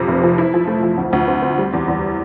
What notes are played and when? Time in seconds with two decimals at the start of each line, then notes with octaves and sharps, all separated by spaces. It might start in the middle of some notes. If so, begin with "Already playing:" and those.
Already playing: F2 C3
0.08 F1
0.23 F3
0.38 E4
0.54 F3
0.67 A3
0.83 F3
0.98 D2
1.13 D2
1.28 C4
1.42 C4
1.58 G3
1.73 E2
1.88 E2